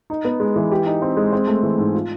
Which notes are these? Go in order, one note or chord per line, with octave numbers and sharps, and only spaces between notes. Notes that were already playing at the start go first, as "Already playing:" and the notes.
D#4
B3
G#3
E3
G4
D#4
C4
G#3
C4
A3
E3
G#2
F4